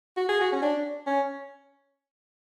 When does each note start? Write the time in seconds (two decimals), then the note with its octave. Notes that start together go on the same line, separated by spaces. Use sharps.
0.17 F#4
0.29 G#4
0.41 F#4
0.52 C#4
0.62 D4
1.07 C#4